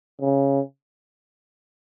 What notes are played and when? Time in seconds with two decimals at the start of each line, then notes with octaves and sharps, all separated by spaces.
0.21 C#3